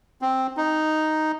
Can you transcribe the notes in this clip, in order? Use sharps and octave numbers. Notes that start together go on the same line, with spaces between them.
C4
D#4